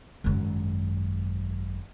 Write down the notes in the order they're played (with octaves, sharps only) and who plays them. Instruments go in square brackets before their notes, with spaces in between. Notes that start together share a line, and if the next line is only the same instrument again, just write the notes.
[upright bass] G#1 F#2